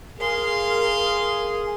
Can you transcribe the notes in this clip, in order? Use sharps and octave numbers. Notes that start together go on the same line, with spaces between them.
G#4 A#4 F5 C6